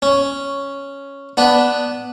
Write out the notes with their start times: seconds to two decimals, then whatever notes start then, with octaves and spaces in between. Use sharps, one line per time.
0.02 C#4
1.37 B3 D4 B4